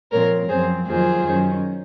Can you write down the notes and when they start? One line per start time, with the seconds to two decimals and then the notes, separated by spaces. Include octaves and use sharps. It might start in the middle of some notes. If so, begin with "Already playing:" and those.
0.12 A#2 F3 C4 A#4 C#5
0.50 F#2 F3 C4 G#4 C5
0.87 F2 D#3 F#3 A#3 F4 G#4 C5
1.24 F#2 D#3 F#3 C#4